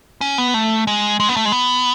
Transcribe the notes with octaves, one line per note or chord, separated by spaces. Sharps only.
C#4
B3
A3
G#3
G#3
B3
A3
G#3
B3